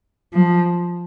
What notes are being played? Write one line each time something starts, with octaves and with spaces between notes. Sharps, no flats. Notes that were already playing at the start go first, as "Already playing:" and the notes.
F3